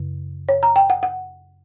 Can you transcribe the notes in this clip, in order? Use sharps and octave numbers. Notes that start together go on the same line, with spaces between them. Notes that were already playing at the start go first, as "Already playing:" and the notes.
Already playing: F#2 C#3
C#5
A#5
G5
F#5
F#5